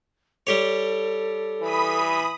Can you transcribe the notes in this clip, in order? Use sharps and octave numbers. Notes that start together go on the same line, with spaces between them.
G3 G4 A4 C#5
E3 B5 D#6